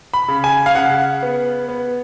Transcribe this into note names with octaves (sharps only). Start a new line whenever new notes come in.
B5
C#3
G#5
F5
C#3 F#5
B3
B3